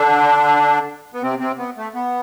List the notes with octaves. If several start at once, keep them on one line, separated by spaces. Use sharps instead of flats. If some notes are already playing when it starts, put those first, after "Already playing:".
Already playing: D3 D4
B3
C3 C4
C3 C4
B3
A3
B3